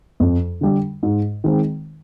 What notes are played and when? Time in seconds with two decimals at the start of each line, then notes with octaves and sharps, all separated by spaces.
0.20 F2
0.61 D3 G3
1.03 G#2
1.44 D#3 G#3 C4